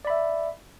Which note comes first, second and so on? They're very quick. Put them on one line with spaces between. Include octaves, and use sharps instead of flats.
D5 B5 E5